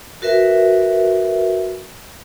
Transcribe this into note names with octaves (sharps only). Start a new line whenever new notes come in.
F#4 A#4 B4 E5